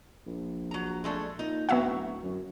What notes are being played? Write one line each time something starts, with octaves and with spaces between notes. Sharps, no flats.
A#1
F#3 A#5
G#3 A3 D4
A#2 D#4
D1 F#3 B3 F#4 E5 F#5
F#2